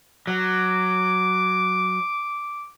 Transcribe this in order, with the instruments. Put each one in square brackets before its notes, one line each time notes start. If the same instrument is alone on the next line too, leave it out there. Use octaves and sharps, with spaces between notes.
[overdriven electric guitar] F#3 [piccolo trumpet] D6